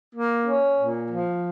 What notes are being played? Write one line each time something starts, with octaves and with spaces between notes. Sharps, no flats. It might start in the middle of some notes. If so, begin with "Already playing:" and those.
A#3
C#4
A#2
F3